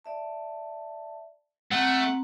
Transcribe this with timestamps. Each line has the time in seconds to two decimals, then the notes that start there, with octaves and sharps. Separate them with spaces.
0.05 D5 E5 A5
1.72 A3 C4 F#5 A#5